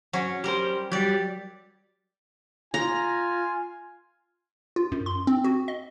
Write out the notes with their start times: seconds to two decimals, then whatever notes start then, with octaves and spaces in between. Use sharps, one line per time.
0.13 F#3 C#4
0.44 G3 G4 A#4 C5
0.92 F#3 G3 G4 D5
2.74 F4 G#5 A#5
4.76 F4
4.92 F#2
5.06 C6
5.27 C4
5.44 F#4
5.68 D#5